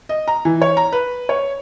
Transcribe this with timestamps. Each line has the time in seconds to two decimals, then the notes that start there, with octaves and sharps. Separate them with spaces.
0.09 D#5
0.28 A#5
0.45 E3
0.62 C#5
0.77 A#5
0.93 B4
1.29 C#5